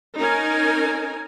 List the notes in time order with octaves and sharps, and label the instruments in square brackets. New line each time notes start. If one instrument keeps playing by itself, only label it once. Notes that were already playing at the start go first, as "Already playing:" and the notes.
[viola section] C#4 D#4 A#4 G#5 A#5